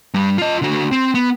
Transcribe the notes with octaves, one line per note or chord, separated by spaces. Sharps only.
G2 G3
F4 D#5
D3 F#4
C4
B3